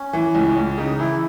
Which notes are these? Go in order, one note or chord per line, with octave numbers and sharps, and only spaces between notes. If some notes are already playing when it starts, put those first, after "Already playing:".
Already playing: C#4
E3
C#2
C#2
C#3 D#4
E3 E4